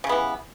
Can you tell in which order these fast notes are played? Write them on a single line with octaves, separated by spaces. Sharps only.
C#3 G3 B3 E3